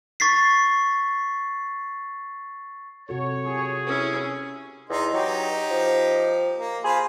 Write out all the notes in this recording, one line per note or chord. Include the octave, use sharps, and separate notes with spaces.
C#6 A6 B6 C7
C3 F#4 A4 C#5
F4 G4 G#4
C#4 E4
E2 D#4 C6
F#3 D#4 G4
F3
A#3
F4 G#4 C5 B5